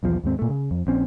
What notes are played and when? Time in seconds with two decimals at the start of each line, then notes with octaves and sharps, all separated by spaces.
0.03 B1 E2 F3
0.24 D#2 G#2 C4
0.39 A#2 A3
0.50 C#3
0.71 F2
0.87 A#1 C4 C#4